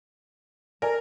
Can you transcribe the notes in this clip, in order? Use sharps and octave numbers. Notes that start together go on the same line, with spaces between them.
A4 A#4 D5 G#5